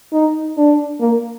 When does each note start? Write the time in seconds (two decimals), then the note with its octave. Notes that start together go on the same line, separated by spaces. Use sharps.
0.12 D#4
0.57 D4
1.00 A#3